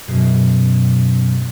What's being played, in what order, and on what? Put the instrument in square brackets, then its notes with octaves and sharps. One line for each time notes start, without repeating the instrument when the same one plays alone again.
[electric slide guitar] F#2 B2 G#4